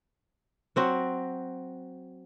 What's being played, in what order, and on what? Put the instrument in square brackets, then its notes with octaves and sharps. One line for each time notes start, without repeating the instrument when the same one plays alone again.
[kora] F#3 C4 F#4